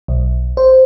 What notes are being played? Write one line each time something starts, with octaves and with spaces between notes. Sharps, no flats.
B1
C5